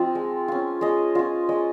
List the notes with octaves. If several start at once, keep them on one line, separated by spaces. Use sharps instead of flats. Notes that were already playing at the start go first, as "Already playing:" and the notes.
Already playing: F3 C4 F4 D#5
G#3
C#4 F4
G#3 D#5
C#4 F4 D#5
G#3 D#5